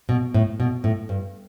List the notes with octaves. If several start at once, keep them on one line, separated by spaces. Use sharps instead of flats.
B2
A2
B2
A2
G2